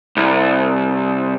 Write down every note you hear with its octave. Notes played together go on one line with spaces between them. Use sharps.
C2